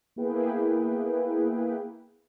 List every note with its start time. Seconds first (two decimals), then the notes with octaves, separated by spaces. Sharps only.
0.16 A#3 B3 E4 G#4 B4 G5